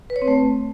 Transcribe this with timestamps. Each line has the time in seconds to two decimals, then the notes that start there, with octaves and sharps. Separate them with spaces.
0.10 B4
0.16 C#5
0.22 C4
0.28 A3